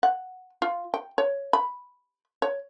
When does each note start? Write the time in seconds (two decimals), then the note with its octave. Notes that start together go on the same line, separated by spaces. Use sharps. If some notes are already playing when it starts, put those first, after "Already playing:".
0.03 F#5
0.62 F4
0.94 G5
1.18 C#5
1.53 B5
2.42 C#5